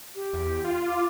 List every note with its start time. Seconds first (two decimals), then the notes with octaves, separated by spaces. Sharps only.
0.15 G4
0.33 E2
0.64 F4
0.87 D6